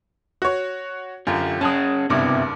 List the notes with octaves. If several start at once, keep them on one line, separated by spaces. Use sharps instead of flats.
F#4 C#5
F#2 D3 F4 G4
C#4 G#4 F#5 A5 D#6
F#1 G2 C3 B3 E4 D6